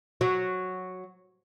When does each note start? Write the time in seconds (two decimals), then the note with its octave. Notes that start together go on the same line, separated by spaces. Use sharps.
0.21 F#3